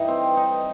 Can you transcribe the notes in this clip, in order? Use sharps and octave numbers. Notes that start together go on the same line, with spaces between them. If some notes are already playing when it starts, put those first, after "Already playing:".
Already playing: G2 E3 G3 D#4
C4
D#4